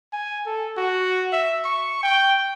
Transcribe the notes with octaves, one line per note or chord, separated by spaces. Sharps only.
G#5
A4
F#4
E5
C#6
G5